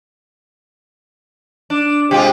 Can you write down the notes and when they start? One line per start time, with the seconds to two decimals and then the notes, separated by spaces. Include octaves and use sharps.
1.70 D4
2.11 C3 G#3 F4 G4 G5